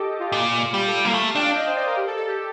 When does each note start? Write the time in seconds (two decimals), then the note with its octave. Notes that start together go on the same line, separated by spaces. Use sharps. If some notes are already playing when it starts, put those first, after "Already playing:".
Already playing: G4 A4 D#5 D6
0.20 F4
0.32 A#2 F4
0.74 G3 G4
0.88 A4
1.01 F5
1.05 A#3
1.14 A3
1.30 F5
1.35 D4 G5
1.56 D#5
1.66 C5
1.76 D5
1.86 A#4
1.96 G4
2.07 A4
2.17 A4
2.27 G4